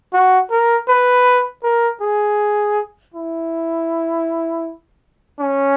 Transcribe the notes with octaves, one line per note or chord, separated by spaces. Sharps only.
F#4
A#4
B4
A#4
G#4
E4
C#4